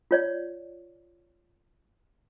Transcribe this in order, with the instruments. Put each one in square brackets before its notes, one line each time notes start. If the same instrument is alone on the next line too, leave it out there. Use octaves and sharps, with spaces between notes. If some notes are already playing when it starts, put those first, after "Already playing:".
[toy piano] F4 C#5 D5